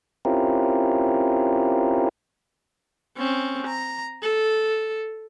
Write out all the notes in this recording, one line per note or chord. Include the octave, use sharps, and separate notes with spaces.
C4 C#4 E4 F4 G4 A#4
C4 C#4
A#5
A4